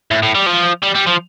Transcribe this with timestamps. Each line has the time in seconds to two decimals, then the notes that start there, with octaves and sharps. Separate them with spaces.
0.11 A2
0.23 A2
0.35 G3
0.46 F3
0.83 G3
0.95 G3
1.07 F3